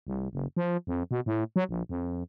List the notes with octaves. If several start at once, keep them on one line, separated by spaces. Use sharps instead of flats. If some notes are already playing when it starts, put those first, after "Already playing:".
C2
F#1
F3
F2
B2
A2
F#3
A#1
F2